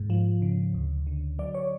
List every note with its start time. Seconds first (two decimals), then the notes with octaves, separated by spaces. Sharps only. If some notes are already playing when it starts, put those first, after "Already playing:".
Already playing: G#2
0.10 F3
0.42 C#3
0.74 D2
1.07 D3
1.39 F#3 D5
1.55 C#5